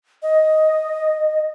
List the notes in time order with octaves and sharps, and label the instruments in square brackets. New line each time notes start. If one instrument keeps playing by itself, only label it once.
[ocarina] D#5